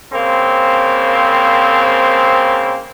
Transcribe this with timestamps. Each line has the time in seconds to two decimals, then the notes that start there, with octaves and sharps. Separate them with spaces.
0.13 C#3 A#3 C4